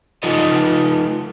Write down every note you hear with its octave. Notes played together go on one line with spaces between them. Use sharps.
F3 D#4 F4 A4 C5 D#5